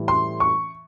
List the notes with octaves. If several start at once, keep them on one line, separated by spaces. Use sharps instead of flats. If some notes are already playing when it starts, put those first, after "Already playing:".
Already playing: A2 E3 G3
C6
C#6